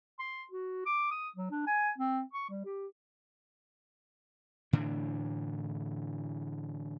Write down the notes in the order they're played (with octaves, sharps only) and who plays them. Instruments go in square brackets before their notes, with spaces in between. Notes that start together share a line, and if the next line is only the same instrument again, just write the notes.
[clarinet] C6
F#4
D6
D#6
F#3
D4
G#5
C4
C#6
G3
G4
[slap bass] A2 D3 E3 D4